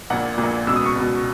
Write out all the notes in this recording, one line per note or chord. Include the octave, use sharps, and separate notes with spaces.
A#1 A#2 F#5
A#2
A#1
C#2 B2 E6
D#6
C#6
C#2 B2